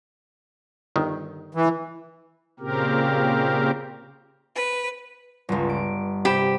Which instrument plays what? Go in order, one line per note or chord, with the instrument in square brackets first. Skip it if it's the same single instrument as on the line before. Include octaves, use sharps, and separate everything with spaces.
[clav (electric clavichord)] G1 D#3
[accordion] E3
[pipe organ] A#2 C#3 C4 G4 A#4
[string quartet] B4
[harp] G1 C#2
D7
[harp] C3 B5 E7 [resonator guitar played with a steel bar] G4